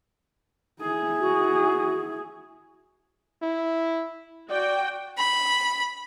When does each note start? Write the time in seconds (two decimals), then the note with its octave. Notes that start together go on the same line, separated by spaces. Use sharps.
0.82 E4 G#4
1.20 F#4
3.42 E4
4.50 F#4 D5 G5
5.19 B5